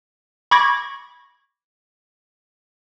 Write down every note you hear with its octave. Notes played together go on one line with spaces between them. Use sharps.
B5 C#6 D6 G#6 A#6